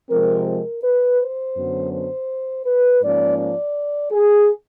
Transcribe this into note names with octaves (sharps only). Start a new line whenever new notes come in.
C3 F3 G#3 C4 A#4
A#4
B4
C5
F#2 D3 F#3 B3
C5
B4
G#2 F3 A#3 C#4 D5
D5
G#4